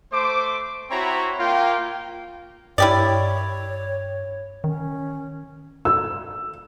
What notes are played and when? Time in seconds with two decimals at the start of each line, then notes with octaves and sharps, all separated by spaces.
0.12 A3 C5 D6
0.90 C4 E4 F#4 C#5 A#5 B5
1.39 A#3 F4 G5
2.78 G2 E4 G4 C#5 D5
4.64 D#3 C#4
5.85 E6